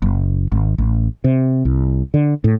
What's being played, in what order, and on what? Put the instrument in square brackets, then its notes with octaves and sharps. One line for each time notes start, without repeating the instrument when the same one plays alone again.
[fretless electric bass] F#1
G#1
A1
C3
C2
D3
A2